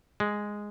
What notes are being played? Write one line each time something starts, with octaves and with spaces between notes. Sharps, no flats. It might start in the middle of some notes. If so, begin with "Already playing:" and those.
G#3